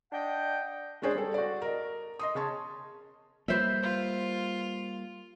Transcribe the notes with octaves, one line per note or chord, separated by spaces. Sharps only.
D4 D#5 F#5 G5
G#3 C#4 D4 G#4 C5
G3 A4
F#4 D5
A#4 D#5
D#5 C6 D#6
C#3 C#4 A5 C6
G3 A#3 B4 C5 E5
F4